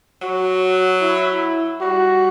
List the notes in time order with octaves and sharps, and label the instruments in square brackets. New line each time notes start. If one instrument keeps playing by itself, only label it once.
[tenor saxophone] F#3 [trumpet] F#4
[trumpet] E4
[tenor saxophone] G3 [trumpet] F#4